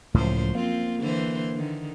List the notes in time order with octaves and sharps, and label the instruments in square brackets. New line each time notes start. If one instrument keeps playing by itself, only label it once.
[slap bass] C#2 A2 [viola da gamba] F#2 F3 C5
[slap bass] A#3 [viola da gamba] C4 F4
[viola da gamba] D3 E3 C5
D3 D#3